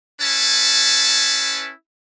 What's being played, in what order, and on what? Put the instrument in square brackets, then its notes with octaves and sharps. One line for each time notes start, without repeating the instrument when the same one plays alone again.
[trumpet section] C#4 E4 B4 A5